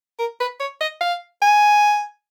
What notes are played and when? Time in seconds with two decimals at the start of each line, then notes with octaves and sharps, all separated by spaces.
0.19 A#4
0.40 B4
0.60 C#5
0.81 D#5
1.01 F5
1.42 G#5